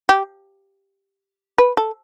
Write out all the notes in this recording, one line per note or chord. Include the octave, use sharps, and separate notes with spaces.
G4
B4
A4